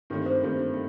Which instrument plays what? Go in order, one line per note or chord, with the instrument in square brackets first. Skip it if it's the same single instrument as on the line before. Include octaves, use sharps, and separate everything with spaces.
[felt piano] G2 D#3 A3 C4
[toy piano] C5
[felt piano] G2 D#3 A3 C4
A3